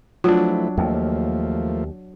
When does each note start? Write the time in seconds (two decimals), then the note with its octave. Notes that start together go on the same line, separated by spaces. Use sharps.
0.24 F3 F#3 A3 D4 E4 F4
0.78 D#2 F3 A3 A#3